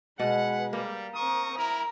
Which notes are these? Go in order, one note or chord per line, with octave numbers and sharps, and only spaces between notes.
B2 G#3 B4 F#5
G3 A#3
C4 A#4 C#6 D#6
E4 A#4 A#5